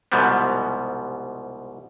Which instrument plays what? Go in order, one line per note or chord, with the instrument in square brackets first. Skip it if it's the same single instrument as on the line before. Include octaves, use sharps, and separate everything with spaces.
[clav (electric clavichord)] C2 G#2 B2 F3 G3 B3